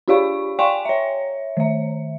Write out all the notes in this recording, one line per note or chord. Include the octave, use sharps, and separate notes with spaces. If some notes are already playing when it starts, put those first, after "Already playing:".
D4 F4 G4 D5 F5 C#6
D5 F5 G5 G#5 C6 C#6
C#5 E5
D#3 E5